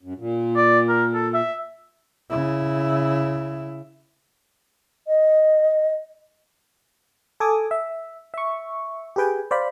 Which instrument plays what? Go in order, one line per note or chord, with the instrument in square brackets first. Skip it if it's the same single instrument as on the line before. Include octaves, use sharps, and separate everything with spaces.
[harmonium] F#2
A#2
[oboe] D5
A#4
A4
E5
[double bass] C#3 E4
[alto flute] D#5
[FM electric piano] A4 G#5 D6 D#6
E5
E5 C#6
G4 G#4 B4 G5 G#5
C5 D5 F5 B5